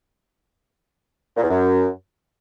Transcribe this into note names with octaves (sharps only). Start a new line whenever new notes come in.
A#2
E2
F#2